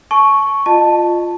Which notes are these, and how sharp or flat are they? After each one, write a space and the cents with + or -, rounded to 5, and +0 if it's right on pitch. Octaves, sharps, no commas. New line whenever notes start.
A5 -30 C#6 +0
F4 +0 D#5 -30 A5 +5